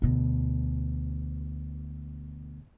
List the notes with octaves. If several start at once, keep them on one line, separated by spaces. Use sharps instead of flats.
D2 B2